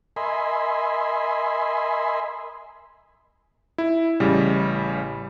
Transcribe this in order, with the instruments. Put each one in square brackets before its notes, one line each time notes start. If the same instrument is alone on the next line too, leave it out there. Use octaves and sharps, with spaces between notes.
[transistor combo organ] A#4 D#5 E5 G#5 B5 C6
[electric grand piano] E4
A1 C#3 G3